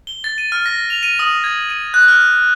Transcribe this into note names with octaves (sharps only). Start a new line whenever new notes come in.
G7
A6
D#7
F6
A#6
F7
D#7
D#6
G#6
D#7
F#6
F6